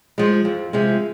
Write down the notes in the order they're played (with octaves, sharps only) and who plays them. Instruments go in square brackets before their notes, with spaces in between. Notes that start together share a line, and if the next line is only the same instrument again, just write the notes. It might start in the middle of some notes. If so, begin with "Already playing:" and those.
[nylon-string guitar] F3 G#3
F2
C3 F3 G#3